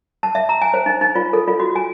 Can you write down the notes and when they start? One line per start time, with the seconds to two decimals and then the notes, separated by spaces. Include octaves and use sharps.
0.23 A5
0.35 E5
0.49 A#5
0.62 G#5
0.74 C5
0.86 D#4
1.01 D#4
1.15 F4
1.33 A4
1.48 F4
1.60 F#4
1.76 G#5